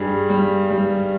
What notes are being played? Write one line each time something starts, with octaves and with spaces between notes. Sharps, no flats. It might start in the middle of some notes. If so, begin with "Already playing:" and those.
Already playing: G2 G3 G#4
G3
G3